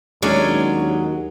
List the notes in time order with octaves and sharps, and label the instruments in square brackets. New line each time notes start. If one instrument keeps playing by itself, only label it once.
[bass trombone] D#2 [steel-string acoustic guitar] F#3 G#3 [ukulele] C#4 D4